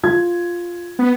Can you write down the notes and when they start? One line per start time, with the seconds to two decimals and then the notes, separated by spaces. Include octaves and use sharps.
0.03 F4 G#6
0.99 B3